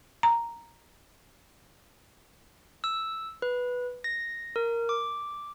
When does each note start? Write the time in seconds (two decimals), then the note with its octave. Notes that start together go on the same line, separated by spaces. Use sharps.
0.23 A#5
2.84 E6
3.42 B4
4.04 A#6
4.56 A#4
4.89 D6